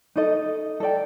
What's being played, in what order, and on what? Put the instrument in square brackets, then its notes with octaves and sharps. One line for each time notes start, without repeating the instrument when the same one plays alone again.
[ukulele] D#4 A4 D#5
A4 D5 G5